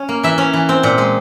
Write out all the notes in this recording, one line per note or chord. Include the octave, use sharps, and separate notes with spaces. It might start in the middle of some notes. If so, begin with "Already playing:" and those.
Already playing: C#4
A#3
E3 E5
C#4
E3
C4
A#2
G#3